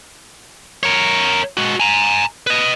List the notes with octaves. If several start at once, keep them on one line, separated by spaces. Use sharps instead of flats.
A#4 C#5
G#3 F#4
G#5 A#5
B4 D#5